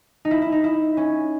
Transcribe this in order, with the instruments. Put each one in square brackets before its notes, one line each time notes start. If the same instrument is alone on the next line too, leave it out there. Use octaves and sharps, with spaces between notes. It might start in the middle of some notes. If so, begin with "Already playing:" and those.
[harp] D#4
E4
E4
D#4
E4
C#4